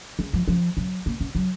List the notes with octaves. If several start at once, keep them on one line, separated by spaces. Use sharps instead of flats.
C#3
F3
F3
F#3
A#3
C#4
F#3